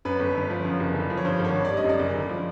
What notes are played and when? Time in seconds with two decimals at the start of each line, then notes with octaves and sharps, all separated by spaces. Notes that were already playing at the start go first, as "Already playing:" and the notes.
0.05 F#2 B4
0.20 G1
0.35 D3
0.50 F3
0.65 F#2
0.80 F#1
0.95 D3
1.10 F3
1.17 C#5
1.25 G2 C5
1.40 G#1 C#5
1.54 D3
1.65 G3 D5
1.77 D#5
1.84 F#2
1.89 D5
2.00 F#1
2.15 D3
2.29 F3